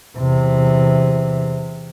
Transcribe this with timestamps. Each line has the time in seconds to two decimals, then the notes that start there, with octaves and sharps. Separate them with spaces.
0.18 E2 C3